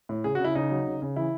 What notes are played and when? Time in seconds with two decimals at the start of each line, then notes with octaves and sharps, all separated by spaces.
0.09 A2
0.24 C#3 G#4
0.35 F#4
0.39 C#3
0.45 E4
0.55 C#3 D#4
0.71 F#3
0.87 C#3
1.02 C#3
1.16 E3 E4